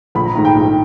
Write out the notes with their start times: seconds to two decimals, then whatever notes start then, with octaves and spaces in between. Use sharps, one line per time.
0.15 A#1 B5
0.25 A#5
0.35 G#2 D#3 A#5
0.45 G5
0.55 A#1